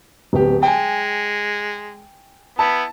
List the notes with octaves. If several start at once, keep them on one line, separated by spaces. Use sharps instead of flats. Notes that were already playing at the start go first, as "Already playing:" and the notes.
D1 B3 G4
G#3 G5 G#5
B3 E4 A5